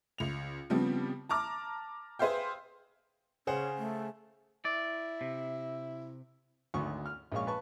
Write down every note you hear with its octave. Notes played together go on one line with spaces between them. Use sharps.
C#2 F7
C#3 F3 G3 B3 C4 G4
A5 A#5 D6 F6
G#4 B4 C5 E5 F5 G5
C#3 C#4 G#4 C5 F#5
A3
E4 D5
C3
G#1 D2 C#6
F6
A#1 G#3 C#5 F5 C#6
B4 A5 C#6